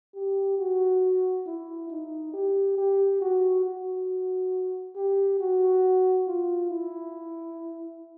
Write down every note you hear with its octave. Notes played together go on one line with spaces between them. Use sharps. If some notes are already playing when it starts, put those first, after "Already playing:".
G4
F#4
E4
D#4
G4
G4
F#4
F#4
G4
F#4
F4
E4